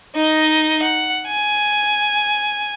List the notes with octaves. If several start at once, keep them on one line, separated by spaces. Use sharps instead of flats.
D#4 D#5
F#5
G#5